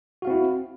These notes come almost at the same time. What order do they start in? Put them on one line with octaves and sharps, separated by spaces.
F#4 F5 C4 E4